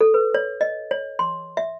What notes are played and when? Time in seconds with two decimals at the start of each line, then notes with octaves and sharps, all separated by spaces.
0.01 A4
0.14 B4
0.34 C#5
0.61 D#5
0.91 C#5
1.19 C6
1.57 E5